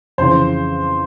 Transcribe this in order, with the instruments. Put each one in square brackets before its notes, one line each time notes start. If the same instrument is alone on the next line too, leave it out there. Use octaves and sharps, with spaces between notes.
[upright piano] F2 C#3 E3 C5